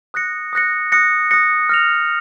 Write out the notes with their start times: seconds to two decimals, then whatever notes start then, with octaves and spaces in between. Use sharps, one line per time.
0.14 D#6 F#6 A#6 C#7
0.53 D#6 F#6 A#6 C#7
0.92 D#6 F#6 A#6 C#7
1.31 D#6 F#6 A#6 C#7
1.69 F6 A#6 F7